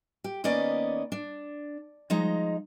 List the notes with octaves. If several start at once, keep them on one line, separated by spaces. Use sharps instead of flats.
G4
D#2 A#3 B3 C#4 D5 D#5
D4
F3 G#3 D#4 A#5